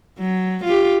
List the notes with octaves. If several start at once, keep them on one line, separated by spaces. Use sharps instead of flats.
F#3
F4 G4